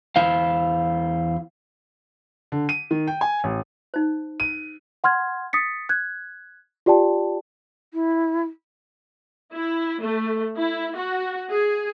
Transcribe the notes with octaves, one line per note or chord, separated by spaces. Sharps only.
E2 E4 C5 F5
D3
D#7
D#3
G5
G#5
A1
D#4 C5
D#7
F#5 C6 F6 G#6
D#6 A6 B6 C#7
F#6 G#6
F4 G4 D5 G5 A5
E4
E4
A3
E4
F#4
G#4